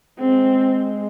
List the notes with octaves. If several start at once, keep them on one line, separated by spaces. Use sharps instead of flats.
G#3 C4